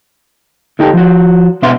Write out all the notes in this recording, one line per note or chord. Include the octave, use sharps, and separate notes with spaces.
D3 D#4 G4 A4
F3 F#4
B2 D4 E5 F#5 C6